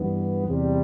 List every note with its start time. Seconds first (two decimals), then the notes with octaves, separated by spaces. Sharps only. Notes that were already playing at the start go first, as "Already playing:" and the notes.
Already playing: G2 E3 B3
0.44 E2 C3 G3